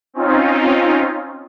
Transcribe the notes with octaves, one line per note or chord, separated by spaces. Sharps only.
C4 C#4 D#4 F4